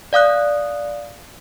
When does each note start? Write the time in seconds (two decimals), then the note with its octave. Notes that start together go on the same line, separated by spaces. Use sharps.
0.13 D5 F5 D#6 F#6